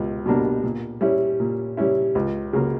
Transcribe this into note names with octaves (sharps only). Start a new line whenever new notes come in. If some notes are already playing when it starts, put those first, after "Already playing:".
Already playing: C#2 B2 G3
B2 G3 A#3 D4
A#2
G3 C#4 E4
A#2
G3 C#4 E4
C#2
C#3 F#3 A#3